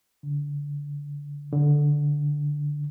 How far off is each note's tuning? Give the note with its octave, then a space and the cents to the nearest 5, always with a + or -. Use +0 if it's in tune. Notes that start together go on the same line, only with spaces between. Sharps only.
D3 -25
D3 -5